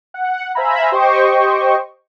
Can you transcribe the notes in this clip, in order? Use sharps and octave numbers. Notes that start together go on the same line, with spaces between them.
F#5
C5 E5 F5 G#5 A#5 B5
G4 C5 D#5 G5 C#6